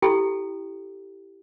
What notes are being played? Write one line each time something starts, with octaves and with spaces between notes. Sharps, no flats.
E4 G4 A4 G5